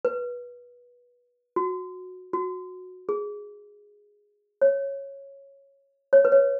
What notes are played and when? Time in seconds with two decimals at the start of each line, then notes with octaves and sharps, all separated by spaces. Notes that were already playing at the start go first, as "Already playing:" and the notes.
0.05 B4
1.56 F#4
2.33 F#4
3.09 G#4
4.62 C#5
6.13 C#5
6.25 B4
6.32 C#5